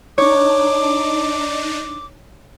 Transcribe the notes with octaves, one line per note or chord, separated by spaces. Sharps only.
D4 D#4 C#5 D6